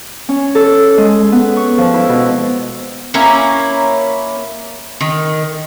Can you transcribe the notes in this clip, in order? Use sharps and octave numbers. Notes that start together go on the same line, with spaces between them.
C#4
A4
G#3
B3
C#6
F3
E4
B2
A#3 C#4 E4 A#5
D#3